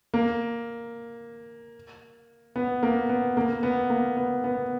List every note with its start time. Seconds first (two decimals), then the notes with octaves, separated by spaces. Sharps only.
0.14 A#3
2.56 B3
2.83 A#3
3.09 B3
3.37 A#3
3.63 B3
3.90 A#3
4.17 B3
4.44 B3